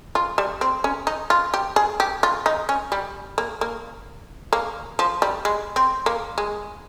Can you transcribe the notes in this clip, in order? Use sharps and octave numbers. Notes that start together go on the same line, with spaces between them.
F4
G3
C4
C#4
D#4
F4
G4
G#4
G4
F4
D#4
C#4
G3
A#3
A#3
A#3
F3
G3
G#3
C4
A#3
G#3